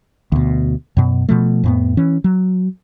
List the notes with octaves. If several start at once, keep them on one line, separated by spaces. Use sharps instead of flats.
D2 B2
F#2 B2
B2 F3 A3
F2 A2 B3
E3 C#4
F#3